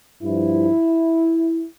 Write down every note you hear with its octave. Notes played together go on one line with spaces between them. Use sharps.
G2 F3 E4